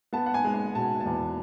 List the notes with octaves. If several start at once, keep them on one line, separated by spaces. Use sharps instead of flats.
B3 A5
F#5
G#5
G#3
G#5
B2 A5
A5
E2